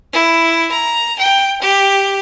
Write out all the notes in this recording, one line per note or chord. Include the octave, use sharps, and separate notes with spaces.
E4
A#5
G5
G4